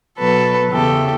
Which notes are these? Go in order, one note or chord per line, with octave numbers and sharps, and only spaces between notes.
B2 F#3 A4 B4
E2 C#3 E3 G4 A4